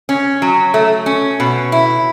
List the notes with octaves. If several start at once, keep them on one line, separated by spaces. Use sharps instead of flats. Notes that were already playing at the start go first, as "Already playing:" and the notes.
C#4
F#3
A3
C#4
B2
E4